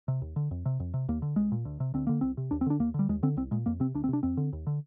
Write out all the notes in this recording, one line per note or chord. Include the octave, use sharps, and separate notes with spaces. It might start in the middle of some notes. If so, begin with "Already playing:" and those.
C3
D#2
D3
F2
C3
F2
C3
D#2 A#3
D3
C2 G#3
A#2
D2
C3
D2 C4
D3 A#3
C2 C4
C3
D#2 D4
C4
D3 D4
D#2 A#3
D3 G3
D#2 G#3
D3 C4
C2 C4
A#2 G#3
F2 A#3
C3 C4
D2 D4
C4
C3 D4
F2 C4
D3
D#2
D3